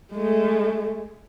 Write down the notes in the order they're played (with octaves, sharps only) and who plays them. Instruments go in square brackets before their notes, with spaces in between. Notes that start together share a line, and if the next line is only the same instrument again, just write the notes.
[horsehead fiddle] G#3 A3